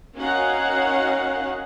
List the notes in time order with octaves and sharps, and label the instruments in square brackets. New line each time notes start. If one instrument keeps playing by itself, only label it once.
[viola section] C#4 D#4 F#4 A#4 F5 F#5